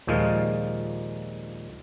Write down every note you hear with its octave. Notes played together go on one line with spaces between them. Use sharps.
D#2 A#2 F3 G#3 F5